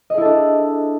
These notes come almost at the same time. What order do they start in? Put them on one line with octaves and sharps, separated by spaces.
D#5 G#4 E4 A4 D4